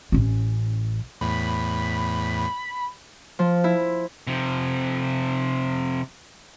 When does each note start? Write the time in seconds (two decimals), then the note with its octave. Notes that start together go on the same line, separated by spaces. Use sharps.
0.12 A1 C#4
1.21 E2 A2 B5
3.39 F3
3.64 E4
4.27 C3 F3